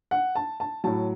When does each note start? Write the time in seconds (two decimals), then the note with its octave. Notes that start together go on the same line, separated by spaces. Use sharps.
0.11 F#5
0.35 A5
0.60 A5
0.84 A2 F#3 A5